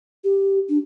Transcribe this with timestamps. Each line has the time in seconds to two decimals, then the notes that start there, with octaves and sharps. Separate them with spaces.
0.24 G4
0.69 D4